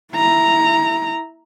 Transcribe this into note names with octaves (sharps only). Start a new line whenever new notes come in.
E4 A#5